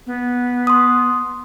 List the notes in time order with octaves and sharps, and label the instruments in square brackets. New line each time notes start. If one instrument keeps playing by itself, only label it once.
[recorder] B3
[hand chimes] C6 D#6